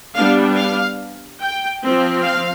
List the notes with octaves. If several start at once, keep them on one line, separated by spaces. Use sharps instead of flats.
G3 B3 D4 F5
F5
G5
F3 C4
F5